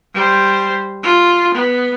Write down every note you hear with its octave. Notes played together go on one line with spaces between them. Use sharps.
G3 C5
F4
B3